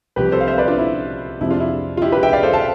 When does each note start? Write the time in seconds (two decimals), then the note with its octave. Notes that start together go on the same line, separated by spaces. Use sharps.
0.16 C2 C3 F3 G4 B4
0.32 A4 C5
0.41 F5
0.47 C5 E5
0.58 B4 D5
0.68 D4 F4
0.79 E4
1.41 F2 C3 F3 E4
1.50 D4 F4
1.60 E4
1.97 F4
2.02 E4 G4
2.12 G4 B4
2.23 E5 G5
2.33 D5 F5
2.43 A4 C5
2.53 F5 A5